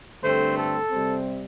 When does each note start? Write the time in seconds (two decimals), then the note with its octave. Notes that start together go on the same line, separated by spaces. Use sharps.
0.23 G2 D3 A3 C4 C5
0.58 A4
0.91 C3 G3 C4